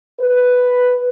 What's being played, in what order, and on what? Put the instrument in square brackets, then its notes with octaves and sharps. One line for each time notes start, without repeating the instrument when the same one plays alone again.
[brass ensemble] B4